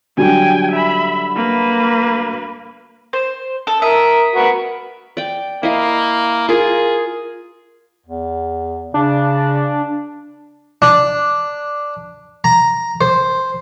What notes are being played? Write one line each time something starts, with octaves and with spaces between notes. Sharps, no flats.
D3 F#3 G3 G5 G#5
E5 B5
A#3 B4
C5
A4
A#4 E5 D#6
F#4 A#4 B4
D5 G5
A#3 E4 D#5 F5
F4 G#4 A#4
E2
C#3 D4
D4
A#5
C5